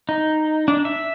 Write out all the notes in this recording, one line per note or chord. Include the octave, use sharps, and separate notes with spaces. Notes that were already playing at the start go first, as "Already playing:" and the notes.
D#4
D4
E5